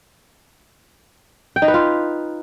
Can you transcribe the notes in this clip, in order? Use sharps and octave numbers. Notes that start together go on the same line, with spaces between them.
G5
D#4
B4
F4